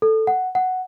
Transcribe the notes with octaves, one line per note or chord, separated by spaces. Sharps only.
A4
F#5
F#5